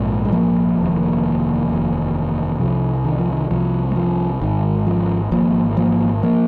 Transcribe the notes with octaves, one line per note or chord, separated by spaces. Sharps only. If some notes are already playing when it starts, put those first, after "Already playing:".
Already playing: A#1 G#2
G#3
F3 A#3
F1 D#2
F1 D#2
C2 C3 F3
D#3
F3
D#3
C2 C3 F3
G#3
F3
G#1 G#2 D#3
F3
G#1 G#2 F3 A#3
F3 A#3
F3 A#3